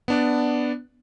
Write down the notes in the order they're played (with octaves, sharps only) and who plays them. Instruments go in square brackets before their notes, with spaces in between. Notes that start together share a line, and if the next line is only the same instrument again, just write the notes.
[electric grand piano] B3 D4 D5